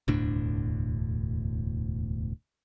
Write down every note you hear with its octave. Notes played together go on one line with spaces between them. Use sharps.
E1 D2 A2 D4